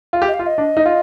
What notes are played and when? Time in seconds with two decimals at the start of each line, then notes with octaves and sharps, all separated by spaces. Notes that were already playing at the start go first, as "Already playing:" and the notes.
0.13 F4
0.22 G4
0.28 D#5
0.34 F5
0.39 F4
0.46 D#5
0.58 D4
0.77 D#4
0.86 F4